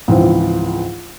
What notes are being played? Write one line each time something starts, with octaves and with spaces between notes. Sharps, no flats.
C#2 G#2 E3 F3 C4